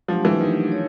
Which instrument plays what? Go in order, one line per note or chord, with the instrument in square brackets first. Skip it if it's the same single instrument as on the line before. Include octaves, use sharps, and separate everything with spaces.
[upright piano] F3 [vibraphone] F#3 A3 D4 G4
[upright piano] E3
D#3
[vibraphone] C#5